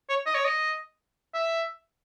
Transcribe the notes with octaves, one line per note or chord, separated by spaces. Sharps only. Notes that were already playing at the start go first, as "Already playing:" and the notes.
C#5
D#5
C#5
D#5
E5